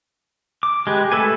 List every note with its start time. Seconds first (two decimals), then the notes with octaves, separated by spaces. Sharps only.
0.63 D6
0.87 G#3 G4 B4
1.12 A3 A4 B4 G#5